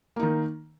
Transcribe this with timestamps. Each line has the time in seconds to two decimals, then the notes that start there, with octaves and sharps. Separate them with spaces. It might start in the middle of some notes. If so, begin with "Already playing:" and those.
0.16 A#3
0.19 D#4
0.23 D#3